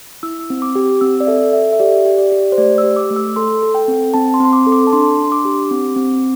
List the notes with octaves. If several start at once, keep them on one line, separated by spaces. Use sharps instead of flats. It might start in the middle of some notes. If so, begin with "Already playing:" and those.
E4 E6
C4
D6
G4
C4 E6
D5
A4 E5
A4 E5
E5
G4 D5
G4
D5
G4
C5
A3 D5
E6
G4
D6
A3
E6
A4 C6
A4
G5
C4
C4 A5
C6
C4
C6
D6
A4
D6
A5
D4 C6
D4
C6
D6
G4
C4
C4